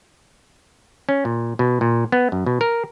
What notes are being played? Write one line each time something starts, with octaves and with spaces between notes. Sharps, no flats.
C#4
A#2
B2
A#2
B3
F#2
B2
A#4